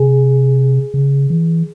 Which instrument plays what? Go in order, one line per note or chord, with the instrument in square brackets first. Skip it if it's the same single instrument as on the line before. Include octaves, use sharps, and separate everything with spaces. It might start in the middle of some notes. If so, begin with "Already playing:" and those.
Already playing: [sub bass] C3 [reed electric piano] G#4
[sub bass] C#3
E3